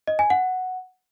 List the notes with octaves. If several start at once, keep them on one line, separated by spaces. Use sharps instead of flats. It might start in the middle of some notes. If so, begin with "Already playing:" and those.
D#5
G#5
F#5